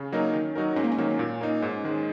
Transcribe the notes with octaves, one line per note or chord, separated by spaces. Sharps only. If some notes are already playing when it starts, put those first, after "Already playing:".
Already playing: C#3 C#4
F#3 A#3 D#4 A#4
D#3
F#3 D#4 F#4 A#4
G#2 C#4
A#3
C#4
D#3 F#3 A#3
A#2
A#3 D#4
G#2
D#3 G#3